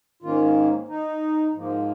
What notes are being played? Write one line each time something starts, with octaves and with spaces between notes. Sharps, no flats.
G#2 D#3 A#3 C#4 F4
D#4
G#2 F3 A#3